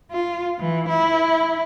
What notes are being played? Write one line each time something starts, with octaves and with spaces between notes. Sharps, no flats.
F4
E3
E4